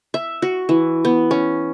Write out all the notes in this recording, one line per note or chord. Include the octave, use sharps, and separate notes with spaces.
E5
F#4
E3
B3
C#4